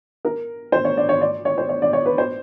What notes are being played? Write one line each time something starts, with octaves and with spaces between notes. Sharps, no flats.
A#4
C5
C#5
D5
C#5
D5
C#5
C5
C#5
D5
C#5
B4
C5